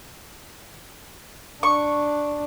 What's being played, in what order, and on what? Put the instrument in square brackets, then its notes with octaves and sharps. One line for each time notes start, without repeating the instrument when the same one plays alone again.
[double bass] D4 [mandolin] C#6